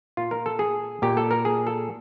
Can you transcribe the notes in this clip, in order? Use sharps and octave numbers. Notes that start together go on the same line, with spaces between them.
A#2 F4
A#4
A4
G#4
A#2 G4
A4
A#4
G#4
A4